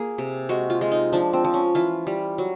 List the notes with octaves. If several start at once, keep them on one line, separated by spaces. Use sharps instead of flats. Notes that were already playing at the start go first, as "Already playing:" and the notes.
Already playing: A#3 G#4
C3
G#3 F#4
F4
G#3
D#4
F3 D4
C4
F3
C#4
E3 F4
G3
F#3